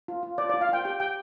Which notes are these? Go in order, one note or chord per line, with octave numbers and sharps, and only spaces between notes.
F4
F4
F4 D5
D5
F4
F5
F4 G5
G4 G5
G4 G5